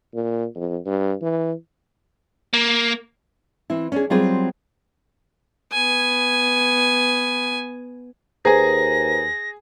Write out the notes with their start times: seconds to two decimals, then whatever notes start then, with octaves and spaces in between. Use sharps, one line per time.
0.14 A#2
0.55 F2
0.86 G2
1.22 E3
2.53 A#3
3.70 E3 C4 E4
3.92 C#4 D4 G#4
4.10 F#3 G3 C4 F4 G#4 C5
5.72 B3 G#5
8.45 D#2 G#4 B4 C5 G#5 A#5 A#6